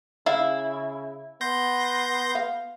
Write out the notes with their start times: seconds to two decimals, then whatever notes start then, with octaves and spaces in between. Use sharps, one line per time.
0.26 C#3 E4 F5
1.41 B3 C6 G6 A#6
2.35 F5